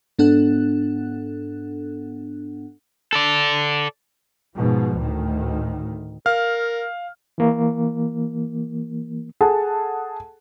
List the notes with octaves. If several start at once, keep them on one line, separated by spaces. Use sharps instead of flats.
G#2 B3 D4 A4 F#5 F#6
A4 D5
G#2 B2 F3
D2 A2 D#3
A#4 F5 F6
E3 A#3
G#4 A4 F#5 A5